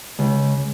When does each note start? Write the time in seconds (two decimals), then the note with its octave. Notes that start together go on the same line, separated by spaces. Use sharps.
0.19 C#2